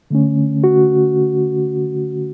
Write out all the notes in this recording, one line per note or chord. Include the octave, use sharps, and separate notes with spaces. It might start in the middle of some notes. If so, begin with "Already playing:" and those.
D3 A3 C#4
F#4